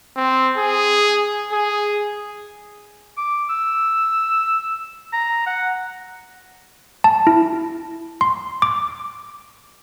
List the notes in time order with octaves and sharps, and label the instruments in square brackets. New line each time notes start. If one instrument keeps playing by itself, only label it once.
[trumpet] C4
G#4
G#4
[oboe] D6
E6
A#5
F#5
[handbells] A5
E4
C6
D6